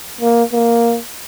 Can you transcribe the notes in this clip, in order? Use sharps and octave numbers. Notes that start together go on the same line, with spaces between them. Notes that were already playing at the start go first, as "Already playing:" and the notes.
A#3
A#3